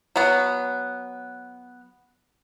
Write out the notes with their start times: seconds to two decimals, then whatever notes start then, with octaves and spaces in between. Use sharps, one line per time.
0.16 F#3 B3